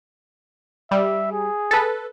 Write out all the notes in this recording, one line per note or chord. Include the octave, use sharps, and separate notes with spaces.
G3 E5
G#4
A4 B4